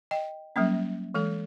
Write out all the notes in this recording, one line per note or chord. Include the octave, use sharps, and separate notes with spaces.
D#5 G5
F#3 G3 A#3 C#4
E3 G#3 A4